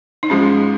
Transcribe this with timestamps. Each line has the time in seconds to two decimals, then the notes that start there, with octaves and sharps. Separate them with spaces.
0.23 D#4
0.30 G#2 F3 G#3 C#4